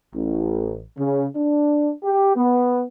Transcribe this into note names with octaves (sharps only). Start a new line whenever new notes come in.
A1
C#3
D4
G4
B3